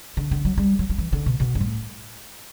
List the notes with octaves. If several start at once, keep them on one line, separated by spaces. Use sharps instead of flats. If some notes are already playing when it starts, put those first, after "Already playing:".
D3
D3
F#3
G3
F#3
F#3
E3
D3
B2
B2
G2
A2